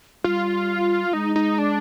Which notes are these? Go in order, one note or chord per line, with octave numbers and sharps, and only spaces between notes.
G3 F4
G#3 D#4
D#4
D4